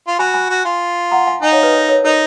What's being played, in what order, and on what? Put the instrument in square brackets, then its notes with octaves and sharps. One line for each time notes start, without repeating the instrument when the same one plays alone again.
[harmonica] F4
[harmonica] F#4 [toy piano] G#5 B5
[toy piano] G#5 B5
[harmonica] F#4
F4
[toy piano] F#5 A#5
F5 G#5
[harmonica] D#4 [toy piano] F5 G#5
[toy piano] C#5 F5
B4 D#5
A#4 C#5
A#4 C#5
[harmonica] D#4 [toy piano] A#4 C#5